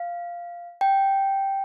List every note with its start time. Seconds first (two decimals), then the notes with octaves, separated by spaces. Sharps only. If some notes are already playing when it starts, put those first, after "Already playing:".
Already playing: F5
0.81 G5